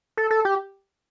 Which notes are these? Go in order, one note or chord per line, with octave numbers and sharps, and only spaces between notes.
A4
A4
G4